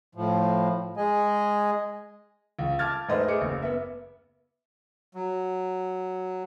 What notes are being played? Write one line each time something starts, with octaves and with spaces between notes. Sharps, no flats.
A2 F3
G#3 G#4 D#5 G#5
C#2
A5 D6 F6 G#6 A6
G#2 A3 B4 C5 D#5
A3 G#4 D6 C#7
F#1
B3 E5
F#3